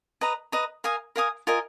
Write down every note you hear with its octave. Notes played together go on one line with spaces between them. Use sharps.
B4 D#5 A#5
B4 D#5 A#5
A#4 F5 G#5 D#6
A#4 F5 G#5 D#6
F4 A#4 D#5 G#5